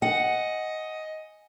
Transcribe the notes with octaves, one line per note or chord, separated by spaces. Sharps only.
D#5 F#5 G#5 C#7